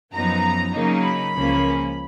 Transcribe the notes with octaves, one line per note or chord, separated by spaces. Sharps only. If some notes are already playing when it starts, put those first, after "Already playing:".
F#2 F3 B3 D#4 A#5
C#3 F#3 A#3 D#4
B5
C#2 C#3 F3 A#3 C#4